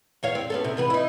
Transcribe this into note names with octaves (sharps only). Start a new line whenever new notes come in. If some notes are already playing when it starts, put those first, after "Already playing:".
E2 C#5 F5
C4
B3 C#4 A4
C3
E3 B3 B4
D#4 E4